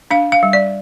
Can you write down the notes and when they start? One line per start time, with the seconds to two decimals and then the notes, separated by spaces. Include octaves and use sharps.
0.11 D4 F5
0.32 F5
0.43 G3
0.53 D5